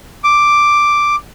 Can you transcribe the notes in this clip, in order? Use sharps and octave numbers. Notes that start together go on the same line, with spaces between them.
D6